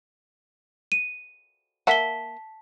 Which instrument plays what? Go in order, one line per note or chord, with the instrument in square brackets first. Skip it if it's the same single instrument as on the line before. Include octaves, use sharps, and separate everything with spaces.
[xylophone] D#7
[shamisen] A#3 E5 F#5 [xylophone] A5 B6 G7